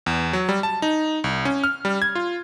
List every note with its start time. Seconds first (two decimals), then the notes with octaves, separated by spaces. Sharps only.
0.06 E2
0.33 F#3
0.49 G3
0.63 A5
0.82 D#4
1.24 C2
1.45 C#4
1.64 F6
1.85 G3
2.02 G#6
2.15 F4